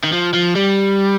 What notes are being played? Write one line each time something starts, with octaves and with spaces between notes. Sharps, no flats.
D#3
F3
F3
G3